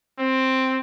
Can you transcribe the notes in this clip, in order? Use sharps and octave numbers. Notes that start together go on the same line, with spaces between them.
C4